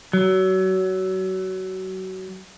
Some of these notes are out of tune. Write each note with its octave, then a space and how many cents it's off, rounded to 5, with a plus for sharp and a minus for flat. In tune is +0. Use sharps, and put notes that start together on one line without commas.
F#3 +25